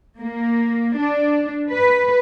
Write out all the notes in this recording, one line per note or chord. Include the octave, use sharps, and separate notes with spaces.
A#3
D4
B4